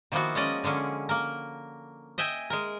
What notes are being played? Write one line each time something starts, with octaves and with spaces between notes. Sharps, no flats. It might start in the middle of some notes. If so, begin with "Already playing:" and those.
D#3 F3 A#3 B3 E4 F#4
G#3 C#4 D5 D#5
D3 G#3 A#3 C#4
A#3 A#4
D#5 E5 G5 G#5
G#3 A#4